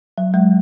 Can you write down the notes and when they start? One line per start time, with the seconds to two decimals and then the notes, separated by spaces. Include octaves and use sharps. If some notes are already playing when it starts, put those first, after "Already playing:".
0.18 F#3
0.34 F#3 G#3